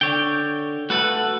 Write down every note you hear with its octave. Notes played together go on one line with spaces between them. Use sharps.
D3 C#5 G5
A3 F#4 A4 B4 F#5